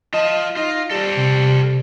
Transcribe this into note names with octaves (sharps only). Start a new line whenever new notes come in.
F4 D#5 A5
D#4 F4 A#6
G3 A4 C5
C3